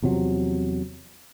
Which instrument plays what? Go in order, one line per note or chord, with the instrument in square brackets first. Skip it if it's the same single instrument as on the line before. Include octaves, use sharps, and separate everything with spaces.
[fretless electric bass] E2 C3 F3 F#3